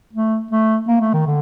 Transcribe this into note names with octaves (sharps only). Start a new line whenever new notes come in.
A3
A3
A#3
A3
D#3
D3